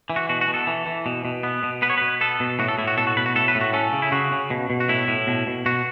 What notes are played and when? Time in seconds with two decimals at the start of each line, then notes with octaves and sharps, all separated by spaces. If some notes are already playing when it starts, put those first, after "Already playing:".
0.10 E3
0.16 F#4
0.29 B2 F#4
0.41 F#4
0.48 B2
0.54 A4
0.67 E3
0.86 E3
1.06 B2
1.25 B2
1.43 B3
1.63 B2
1.82 B3 B4
1.90 C#5
1.97 B2 B4
2.21 B3 A4
2.40 B2
2.59 A2 F#4
2.68 A4
2.78 A2 E4
2.87 F#4
2.97 B2 A4
3.07 F#4
3.16 B2 B4
3.26 F#4
3.35 A2 A4
3.48 B4
3.55 A2
3.61 F#4
3.73 C#4 A4
3.93 C#3
4.02 E4
4.12 C#3 F#4
4.32 C#3
4.50 B2
4.70 B2
4.80 F#4
4.89 A2 E4
5.08 A2
5.27 B2
5.47 B2
5.66 B2 F#4